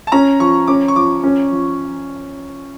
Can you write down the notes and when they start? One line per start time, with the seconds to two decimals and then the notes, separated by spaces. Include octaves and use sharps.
0.07 A5
0.12 C#4 A#5
0.40 F3 C#6
0.68 C#4 D6
0.88 C#6
0.95 F3 D6
1.24 C#4
1.51 F3